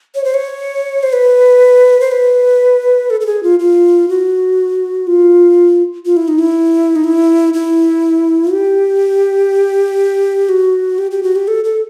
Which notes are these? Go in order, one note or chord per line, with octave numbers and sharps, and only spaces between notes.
C#5
C5
C#5
C5
B4
C5
B4
A4
A4
G#4
F4
F4
F#4
F4
F4
E4
D#4
E4
D#4
E4
E4
G4
F#4
G4
G4
F#4
G4
A4
A4